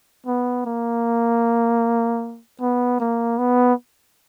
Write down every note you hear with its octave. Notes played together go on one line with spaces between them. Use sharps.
B3
A#3
B3
A#3
B3